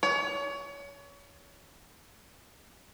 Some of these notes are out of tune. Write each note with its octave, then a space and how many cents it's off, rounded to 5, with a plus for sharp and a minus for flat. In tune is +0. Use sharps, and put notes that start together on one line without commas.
C#5 +30